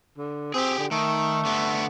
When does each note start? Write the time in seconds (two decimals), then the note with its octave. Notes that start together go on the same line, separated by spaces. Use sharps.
0.18 D3
0.54 C4 G4 G#4
0.79 D3
0.91 D#3 A3
1.45 D3 B3